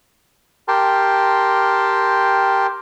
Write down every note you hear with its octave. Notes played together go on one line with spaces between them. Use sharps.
G4 A#4 G5 A5 C6